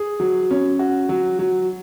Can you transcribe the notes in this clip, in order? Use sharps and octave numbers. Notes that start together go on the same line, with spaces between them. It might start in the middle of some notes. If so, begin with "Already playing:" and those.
Already playing: G#4
F#3
C#4
F#4
F#3
F#3